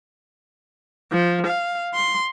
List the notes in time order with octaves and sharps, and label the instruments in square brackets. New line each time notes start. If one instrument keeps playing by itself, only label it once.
[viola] F3
F5
C6